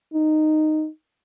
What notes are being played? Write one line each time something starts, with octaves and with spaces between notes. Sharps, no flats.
D#4